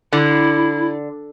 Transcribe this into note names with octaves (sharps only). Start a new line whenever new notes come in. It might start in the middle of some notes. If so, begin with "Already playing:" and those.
D3 E4